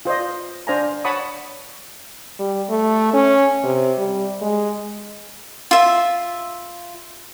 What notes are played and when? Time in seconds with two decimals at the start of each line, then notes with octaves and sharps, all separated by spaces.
0.05 F4 C5 D5 D#5
0.67 D4 C5 D5 F5 G#5 A#5
1.04 C#5 F#5 A5 B5 C#6 D#6
2.39 G3
2.69 A3
3.13 C#4
3.64 C3
3.98 G3
4.41 G#3
5.71 F4 E5